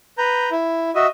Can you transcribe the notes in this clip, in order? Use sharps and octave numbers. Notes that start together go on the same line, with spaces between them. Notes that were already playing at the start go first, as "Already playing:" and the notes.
B4 A#5 G6
E4
F#4 D#5 E5